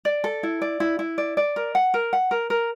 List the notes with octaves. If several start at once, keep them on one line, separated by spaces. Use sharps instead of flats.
D5
A4
E4
D5
E4
E4
D5
D5
A#4
F#5
A#4
F#5
A#4
A#4